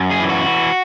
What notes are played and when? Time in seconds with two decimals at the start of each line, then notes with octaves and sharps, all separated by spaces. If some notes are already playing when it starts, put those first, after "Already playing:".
Already playing: F#2
0.11 G#4
0.19 E3
0.29 F#4
0.46 E3